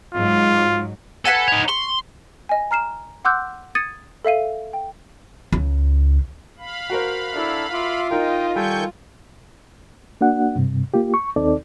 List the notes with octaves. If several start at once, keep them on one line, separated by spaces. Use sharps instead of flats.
G#2 F#3 F4
A4 B4 F#5 G#5
D#4 C#5
C6 C#6
D#5 G#5
A#5 F6 C7 E7
F#5 C6 D6 E6 F#6 G6
D#6 G#6 A6 C#7 D#7
A4 E5 F5 D#7
G5
C#2
F5 B5
F#4 A#4 C5
D4 E4 A4
F4 E5 C6 D6
D#4 A#4 D#5 G5
D#3 G3 A4 G5 G#5 C#6 G6
A#3 D4 F#4 F#5
G2 C3
A#3 F4 G4
C#6
D#2 C4 D#4 A4 D5